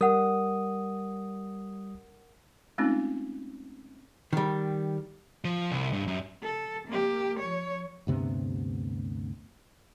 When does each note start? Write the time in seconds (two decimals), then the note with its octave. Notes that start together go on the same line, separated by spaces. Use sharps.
0.01 G3 A#4 F#5 D#6
2.78 G#3 A3 C4 C#4 D#4 F4
4.33 D#3 G3
5.45 F3
5.72 C2
5.93 G2
6.07 F#2
6.43 A4
6.88 A#3 G4
7.40 F3 C#5
8.07 D2 G2 C3 B3